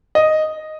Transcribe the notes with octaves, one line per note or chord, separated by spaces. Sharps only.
D#5